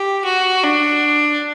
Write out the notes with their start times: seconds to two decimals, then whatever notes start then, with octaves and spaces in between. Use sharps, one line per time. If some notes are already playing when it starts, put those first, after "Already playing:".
Already playing: G4
0.24 F#4
0.63 D4